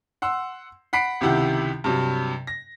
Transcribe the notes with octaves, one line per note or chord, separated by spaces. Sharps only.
F#5 C6 E6
F#5 B5 B6 C7 D7
C#2 C3 D#3 E4 G4 F#5
G2 C3 F#3
A#6